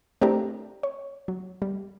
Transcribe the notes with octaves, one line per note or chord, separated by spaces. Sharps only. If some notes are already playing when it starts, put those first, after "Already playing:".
A3 C4 D4 E4 G4 A#4
C#5
F#3
G3